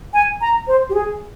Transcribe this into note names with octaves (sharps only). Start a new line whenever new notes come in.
G#5
A#5
C5
G4
G#4